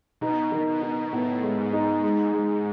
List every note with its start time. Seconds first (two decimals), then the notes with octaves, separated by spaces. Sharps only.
0.21 B2 D#4
0.52 D#3
0.67 B2
0.82 D#4
1.12 A2 B3
1.42 G#3
1.57 G#2
1.73 D#4
2.03 G#3
2.33 G#3